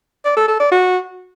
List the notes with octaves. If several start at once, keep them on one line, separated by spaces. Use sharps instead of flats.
D5
A4
A4
D5
F#4